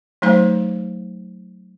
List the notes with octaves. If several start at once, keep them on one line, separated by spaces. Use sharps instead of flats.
F#3 A3 D#4 C5 F5